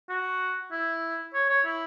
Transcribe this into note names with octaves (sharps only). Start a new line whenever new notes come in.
F#4
E4
C#5
C#5
E4